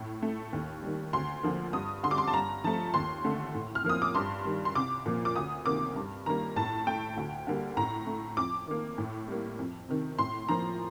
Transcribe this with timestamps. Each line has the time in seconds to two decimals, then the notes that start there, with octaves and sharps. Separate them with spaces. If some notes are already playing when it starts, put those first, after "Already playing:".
Already playing: A2
0.22 A3
0.53 D#2
0.82 D#3 G3
1.13 D2 C6
1.43 D3 F3 A#3
1.73 G2 D#6
2.03 D3 C6
2.08 G3 D6
2.18 C6
2.28 A5
2.33 G2 A#5
2.64 F3 A3 A5
2.94 D#2 C6
3.24 D3 A3
3.54 A2
3.75 F6
3.84 F3 A#3 D#6
4.02 D6
4.15 G2 C6
4.45 D#3 G3
4.65 C6
4.75 C2 D6
5.06 A#2 F3 A#3
5.25 D6
5.36 D2 D#6
5.66 C3 D#3 A#3 D6
5.96 G2
6.26 D#3 G3 A#3 A#5
6.56 A2 A5
6.87 A3 G5
7.17 D2
7.47 D3 G3 A#3
7.77 A2 A#5
8.07 A3
8.37 F2 D6
8.67 D#3 A#3
8.98 A2
9.28 G3 A#3
9.59 F2
9.89 C3 D#3
10.19 A2 C6
10.49 F3 A#3 A#5